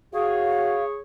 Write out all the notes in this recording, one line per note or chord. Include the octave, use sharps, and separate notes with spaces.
F#4 G#4 C#5 F5